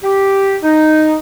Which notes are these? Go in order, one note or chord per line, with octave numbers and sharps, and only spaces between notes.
G4
D#4